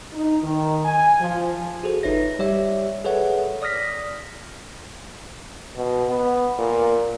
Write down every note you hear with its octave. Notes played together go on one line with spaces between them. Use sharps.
D#4
D#3
G#5
F3
F#4 G#4 A4 C5
G1 D#4 B4 C#5 E5 A#6
G3 G4 C#5 D5 E5
G#4 A4 B4 C#5 E5 F#5
D5 D#6 F6 A#6 B6
B2
B3
A#2